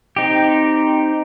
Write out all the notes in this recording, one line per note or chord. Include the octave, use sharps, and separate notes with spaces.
C4 D#4 G4